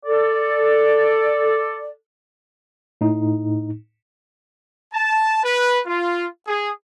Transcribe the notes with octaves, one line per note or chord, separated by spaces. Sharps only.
A4 D5
A2 D#4
A5
B4
F4
G#4